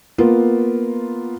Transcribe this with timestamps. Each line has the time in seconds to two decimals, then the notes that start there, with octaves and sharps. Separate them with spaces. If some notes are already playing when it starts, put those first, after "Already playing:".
0.18 A#3 B3 F4